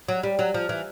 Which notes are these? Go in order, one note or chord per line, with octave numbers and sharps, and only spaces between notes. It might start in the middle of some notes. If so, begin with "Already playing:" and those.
F#3
G3
F#3
F3
E3